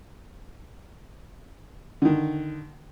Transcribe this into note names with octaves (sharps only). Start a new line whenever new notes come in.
D3 D#3